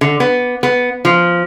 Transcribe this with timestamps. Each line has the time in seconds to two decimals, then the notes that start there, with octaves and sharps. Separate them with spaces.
0.01 D3
0.20 B3
0.63 B3
1.05 F3